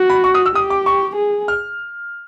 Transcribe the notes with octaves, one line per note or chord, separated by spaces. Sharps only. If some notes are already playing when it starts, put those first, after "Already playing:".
Already playing: F#4
B5
C#6
D#6
E6
G4 D#6
D6
C#6
G#4
F6